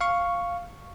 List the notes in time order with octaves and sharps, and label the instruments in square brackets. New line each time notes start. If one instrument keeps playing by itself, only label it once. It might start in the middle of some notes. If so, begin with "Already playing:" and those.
[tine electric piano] F5 C#6